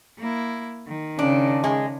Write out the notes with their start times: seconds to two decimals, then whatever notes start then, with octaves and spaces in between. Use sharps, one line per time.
0.20 A#3 E4
0.88 D#3
1.19 C#3 D4
1.64 G#3